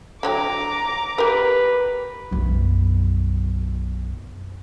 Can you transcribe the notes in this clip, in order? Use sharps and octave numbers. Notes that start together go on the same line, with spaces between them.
D3 F#3 G5 A#5 D6
G4 A#4 B4
B1 F#2